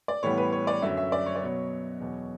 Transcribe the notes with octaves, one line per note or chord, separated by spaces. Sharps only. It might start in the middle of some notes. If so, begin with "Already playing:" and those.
D5
A2 E3 G3 B3 C#5
B4
C#5
D5
F#2 D3 F#3 C#4 E5
E5
D5
C#5
D5
B2 F#3 B3 C#5
E2 B2 F#3